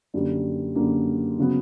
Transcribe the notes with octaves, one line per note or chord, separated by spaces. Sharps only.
F#2 D3 G3 A#3
F#2 D3 G3 A#3
C#3 F#3 B3